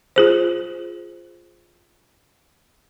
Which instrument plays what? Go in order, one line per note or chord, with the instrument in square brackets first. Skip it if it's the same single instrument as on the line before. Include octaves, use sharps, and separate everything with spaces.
[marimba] F4 G#4 C5